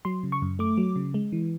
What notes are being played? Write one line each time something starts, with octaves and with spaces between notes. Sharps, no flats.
F#3 C6
C#3
C#6
F#2
A3 D6
F#3
C#3
G#3
E3